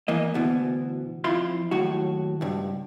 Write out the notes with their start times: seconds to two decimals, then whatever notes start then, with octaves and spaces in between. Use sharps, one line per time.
0.08 E3 A#3 D#5
0.34 D2 B2 E3
1.24 F2 E4 F4 B5 C6
1.71 D#2 A2 F#3 F#4
2.41 C#2 G2